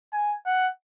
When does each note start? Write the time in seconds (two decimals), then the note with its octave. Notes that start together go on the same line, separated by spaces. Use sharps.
0.13 G#5
0.46 F#5